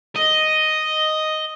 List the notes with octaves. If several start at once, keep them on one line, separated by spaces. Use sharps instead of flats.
D#5